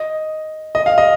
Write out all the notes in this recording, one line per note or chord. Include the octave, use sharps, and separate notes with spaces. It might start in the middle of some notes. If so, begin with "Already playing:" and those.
Already playing: D#5
D#5
F5
D#5